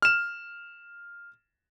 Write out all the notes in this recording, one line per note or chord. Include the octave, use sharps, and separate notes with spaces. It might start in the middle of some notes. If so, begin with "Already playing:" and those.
F6 E7